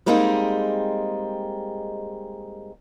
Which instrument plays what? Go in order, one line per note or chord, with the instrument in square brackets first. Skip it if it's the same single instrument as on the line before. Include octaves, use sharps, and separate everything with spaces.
[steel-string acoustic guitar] G3 G#3 A#3 C4 D#4 G#4